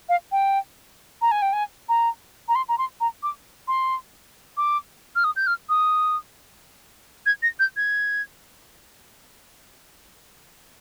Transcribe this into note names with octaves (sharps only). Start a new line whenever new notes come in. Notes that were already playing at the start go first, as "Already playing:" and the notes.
F5
G5
A#5
G#5
G5
G#5
A#5
A#5
C6
A#5
C6
A#5
D6
C6
D6
F6
D#6
G6
F6
D#6
G#6
A#6
G6
G#6